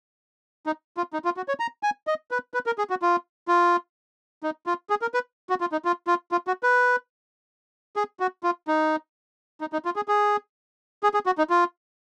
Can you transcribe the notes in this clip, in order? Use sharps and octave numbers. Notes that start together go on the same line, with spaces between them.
D#4
F4
D#4
F4
F#4
C#5
A#5
G#5
D#5
B4
B4
A#4
G#4
F#4
F4
F4
D#4
F4
G#4
A#4
B4
F#4
F4
D#4
F4
F4
F4
F#4
B4
G#4
F#4
F4
D#4
D#4
D#4
F4
G#4
G#4
G#4
G#4
F#4
D#4
F4